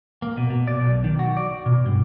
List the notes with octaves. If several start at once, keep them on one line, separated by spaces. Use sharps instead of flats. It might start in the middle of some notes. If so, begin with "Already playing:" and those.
A#3
B2
B2
D5
B1
D#3
F#4
D5
B2
G2